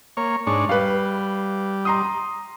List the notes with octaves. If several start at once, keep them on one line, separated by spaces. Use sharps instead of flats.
A#3 C#5
G#2 D4 C#5
G3 B4 F5
A#5 C6 D#6